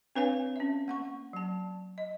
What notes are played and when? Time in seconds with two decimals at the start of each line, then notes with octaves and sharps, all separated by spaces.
0.15 C4 D4 B4 C#5 F5 G#5
0.56 C#4 E5
0.88 A#3 F#5 C#6
1.33 F#3 A5
1.98 D#5